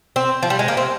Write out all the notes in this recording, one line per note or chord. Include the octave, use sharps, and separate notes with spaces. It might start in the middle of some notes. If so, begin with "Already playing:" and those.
C4
F3
G3
G#3
A#3
C4